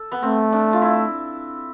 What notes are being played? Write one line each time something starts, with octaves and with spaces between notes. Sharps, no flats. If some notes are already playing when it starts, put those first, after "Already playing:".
Already playing: A4
B3
A3 C4
D4
F4
E4